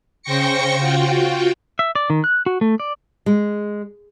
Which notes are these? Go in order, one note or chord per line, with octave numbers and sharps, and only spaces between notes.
C#3 C5 G5 C#6 A#6 C#7
F4 F#4 G5
E5
D5
D#3
F#6
F#4
A3
D5
G#3